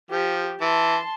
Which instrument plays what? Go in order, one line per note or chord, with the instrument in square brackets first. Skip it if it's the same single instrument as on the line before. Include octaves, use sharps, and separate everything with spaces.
[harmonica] F3 [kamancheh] G4
[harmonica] E3 [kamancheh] A5 C6